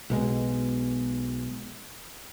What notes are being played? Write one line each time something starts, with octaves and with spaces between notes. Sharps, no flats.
B1 B2 G#3